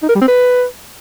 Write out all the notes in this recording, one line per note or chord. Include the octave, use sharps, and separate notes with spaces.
D#4
A#4
G3
C4
B4